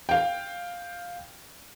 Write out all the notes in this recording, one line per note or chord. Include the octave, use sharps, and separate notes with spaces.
F5 G5